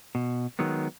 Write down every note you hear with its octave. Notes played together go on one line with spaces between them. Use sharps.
B2
D#3 F#3 G#3 B3